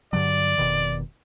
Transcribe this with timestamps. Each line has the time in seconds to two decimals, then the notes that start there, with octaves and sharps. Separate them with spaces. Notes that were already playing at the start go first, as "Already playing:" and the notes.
0.13 G2 D3 F#3 D5
0.58 F1 B2 D#3